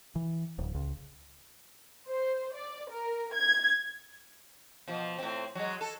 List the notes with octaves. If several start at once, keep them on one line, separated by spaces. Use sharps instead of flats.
E3
D1
C#2
C5
D5
A#4
G#6
B2 F3
A2 C4
F#3 G#3
A4